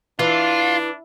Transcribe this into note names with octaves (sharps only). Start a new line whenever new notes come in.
E3 D4 F4